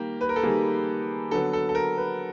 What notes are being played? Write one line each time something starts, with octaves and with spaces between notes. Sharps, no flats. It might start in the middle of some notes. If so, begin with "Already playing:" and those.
Already playing: D#3 G3 A#3 G4
B4
A#4
A4
D#3 G3 A#3 G#4
D3 F#3 B3 A4
A4
A4
A#4
B4